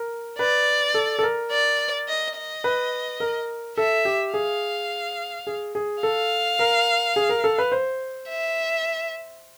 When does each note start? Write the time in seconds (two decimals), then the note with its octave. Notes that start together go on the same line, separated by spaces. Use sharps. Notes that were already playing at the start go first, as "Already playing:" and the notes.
Already playing: A#4
0.39 B4 D5
0.94 A4
1.19 A4
1.23 A#4
1.51 D5
2.08 D#5
2.37 D#5
2.64 B4
3.20 A#4
3.77 A4 E5
4.05 G4
4.34 G#4 F5
5.47 G#4
5.75 G#4
6.03 A4 F5
6.59 A#4
7.16 G#4
7.29 A#4
7.44 A4
7.58 B4
7.72 C5
8.28 E5